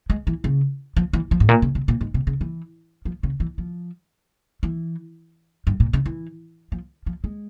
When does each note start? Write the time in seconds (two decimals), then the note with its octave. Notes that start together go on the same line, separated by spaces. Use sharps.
0.10 G#3
0.27 E3
0.44 C#3
0.97 F3
1.13 E3
1.31 F3
1.40 G#2
1.49 A#2
1.62 C#3
1.75 C3
1.88 A#2
2.01 G#2
2.14 C3
2.27 C#3
2.41 E3
3.05 F3
3.23 C#3
3.40 E3
3.58 F3
4.63 E3
5.67 G2
5.80 A#2
5.93 C#3
6.06 E3
6.72 F3
7.06 F3
7.24 G#3